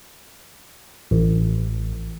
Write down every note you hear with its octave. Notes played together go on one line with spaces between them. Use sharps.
A1